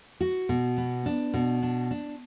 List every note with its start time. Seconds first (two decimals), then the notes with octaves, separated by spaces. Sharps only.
0.21 F#4
0.49 B2
0.78 B3
1.06 D4
1.34 B2
1.63 D4
1.91 D4